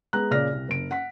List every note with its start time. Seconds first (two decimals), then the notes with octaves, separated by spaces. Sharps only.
0.13 G#3 B3 A#5 F#6
0.31 A#2 C#3 D5 F6 A#6
0.52 C2
0.68 F#1 D7
0.91 F#5 B6